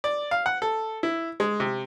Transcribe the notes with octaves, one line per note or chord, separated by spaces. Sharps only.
D5
F5
F#5
A4
E4
G#3
C3